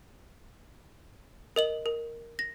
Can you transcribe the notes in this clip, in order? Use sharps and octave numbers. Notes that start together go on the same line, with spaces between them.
A#4 D#5 F#7
A#4
A#6